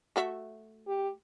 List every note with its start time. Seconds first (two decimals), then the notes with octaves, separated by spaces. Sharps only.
0.16 A3 F#4 E5
0.87 G4